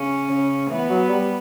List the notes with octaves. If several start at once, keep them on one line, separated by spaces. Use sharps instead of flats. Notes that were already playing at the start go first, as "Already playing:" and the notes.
Already playing: C#3 C#4
C#3
E3 B3
F#3
G3